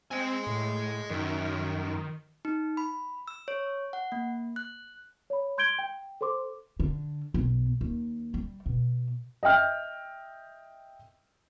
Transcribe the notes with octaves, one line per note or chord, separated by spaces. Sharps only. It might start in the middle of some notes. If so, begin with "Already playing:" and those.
C4 D#5 G#5
A2
F#2 D#3
D#4
B5
E6
C#5
F#5
A#3
F#6
C#5 B5
C6 G6 G#6 D7 G7
G5
A4 C5 C6 D6
D3
B1
D#2
G3
B2
D#5 E5 G5 F6 G6